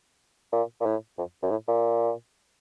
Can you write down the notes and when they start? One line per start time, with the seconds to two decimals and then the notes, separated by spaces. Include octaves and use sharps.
0.52 A#2
0.80 A#2
0.86 A2
1.18 F2
1.43 F#2
1.51 A2
1.68 A#2